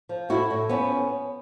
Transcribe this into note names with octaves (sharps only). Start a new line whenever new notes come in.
F3
A2 E4 F#4
A2
F3 B3 C#4